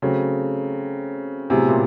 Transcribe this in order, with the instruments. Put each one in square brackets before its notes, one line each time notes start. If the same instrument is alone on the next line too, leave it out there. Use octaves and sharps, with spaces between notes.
[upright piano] C#3 [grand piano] F#3 A3 C4
[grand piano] A2 F#3 B3 E4 G#4 [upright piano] C3
[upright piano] A#2